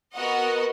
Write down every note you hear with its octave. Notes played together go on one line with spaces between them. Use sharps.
B3 F#4 A#4 D#5 F#5